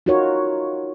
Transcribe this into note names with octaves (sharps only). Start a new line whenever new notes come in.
D#4 F4 F#4 A#4 C#5